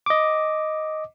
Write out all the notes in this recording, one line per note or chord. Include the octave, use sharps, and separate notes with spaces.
D#5 D6